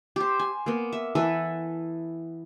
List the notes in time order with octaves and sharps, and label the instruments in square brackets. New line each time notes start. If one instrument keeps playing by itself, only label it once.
[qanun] G4 C5
G#5
A#3 B3
E5
E3 A4 B4 E5